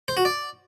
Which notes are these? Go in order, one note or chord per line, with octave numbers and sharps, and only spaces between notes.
C5
F#4
D5